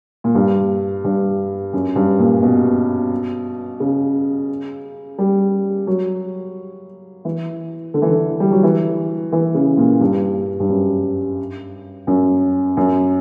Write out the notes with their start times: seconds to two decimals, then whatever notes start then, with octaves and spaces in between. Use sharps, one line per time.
0.24 A#2
0.35 G2
1.05 G2
1.73 F#2
1.96 G2
2.19 A#2
2.43 B2
3.80 C#3
5.18 G3
5.87 F#3
7.25 E3
7.94 D3
8.02 E3
8.09 D3
8.40 G3
8.51 F#3
8.63 E3
9.32 E3
9.54 C#3
9.78 A#2
10.01 G2
10.60 G2
10.69 F#2
12.07 F#2
12.77 F#2